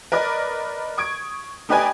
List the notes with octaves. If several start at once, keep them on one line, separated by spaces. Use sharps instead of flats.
A#4 B4 D5 D#5
C#6 D#6 G#6 D7
A3 D#4 G4 B4 D5 G#5